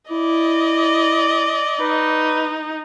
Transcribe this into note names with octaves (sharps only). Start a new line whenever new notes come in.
E4 D5 D#5
D#4 B4